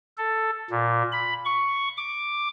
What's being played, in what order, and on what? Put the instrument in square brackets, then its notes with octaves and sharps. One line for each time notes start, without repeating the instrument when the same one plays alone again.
[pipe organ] A4
A#2
B5
C#6
D6